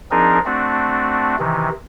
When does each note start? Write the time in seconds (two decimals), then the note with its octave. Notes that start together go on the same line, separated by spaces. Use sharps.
0.11 F3 C4 D4 D#4 G#4 A#4
0.45 A3 C4 D4 F#4
1.39 C3 D#3 E3